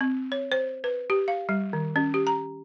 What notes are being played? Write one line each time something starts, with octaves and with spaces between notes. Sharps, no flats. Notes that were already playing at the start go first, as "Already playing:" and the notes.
C4
C#5
C5
B4
G4
F5
G3
D#3
C#4
G4
A#5